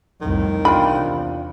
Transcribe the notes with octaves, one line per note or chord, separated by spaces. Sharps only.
C2 F2 A2 D#3
E2 C3 D4 F4 G5 B5